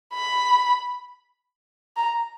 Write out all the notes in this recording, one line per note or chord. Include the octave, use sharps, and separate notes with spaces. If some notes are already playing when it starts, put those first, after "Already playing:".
B5
A#5